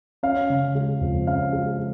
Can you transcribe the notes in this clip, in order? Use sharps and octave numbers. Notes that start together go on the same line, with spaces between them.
C#4 F5
C#3
G#3
F2
C#4 F5
G#3